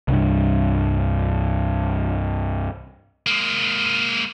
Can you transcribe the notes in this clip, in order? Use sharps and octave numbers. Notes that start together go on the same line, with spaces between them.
C2 G2
G#3 A#3